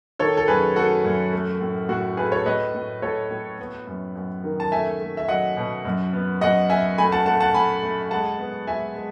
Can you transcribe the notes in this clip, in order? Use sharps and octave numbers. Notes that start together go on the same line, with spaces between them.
D#3 A4 C#5
A4
F#2 G#4 B4
A3 F#4 A4
F#2
A3
A2
A2 F#4
A3 G#4 B4
A4 C#5
A2 B4 D#5
A2
A2 A4 C#5
A2
B3
F#2
F#2
D#3
A5
A3 E5 G#5
A3
E5
F#3 D#5 F#5
B2
F#2
B3
F#2 D#5 F#5
B3 E5 G#5
A3 G#5 B5
F#5 A5
A3 F#5 A5
F#5 A5
A3 G#5 B5
A3
G#3 F#5 A5
B3
G#3 E5 G#5
G#3